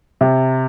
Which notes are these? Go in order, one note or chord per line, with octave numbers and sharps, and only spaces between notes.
C3